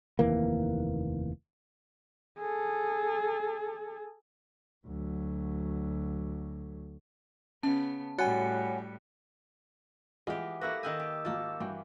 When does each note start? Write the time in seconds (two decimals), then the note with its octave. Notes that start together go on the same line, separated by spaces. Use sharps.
0.19 F1 D#2 E3 A#3
2.39 G#4 A4
4.86 D2 F#3
7.63 C#3 B3 C#4 A5
8.18 A2 G3 F#4 C#5 F#5 G#5 F#6 C#7
10.27 E3 G#3 F4 G4 D#5 F#5
10.61 A#3 E4 F#4 A4 B4 E5 E6 A#6
10.83 D#3 D#5 F#5 G#5 D#6 E6 G6
11.00 G4
11.25 G#1 A#3 F4 A5
11.60 G2 E3 F#4 G5